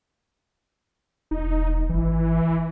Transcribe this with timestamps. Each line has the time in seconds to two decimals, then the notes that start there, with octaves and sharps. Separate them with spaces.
1.31 E1 D#4
1.89 G#1 E3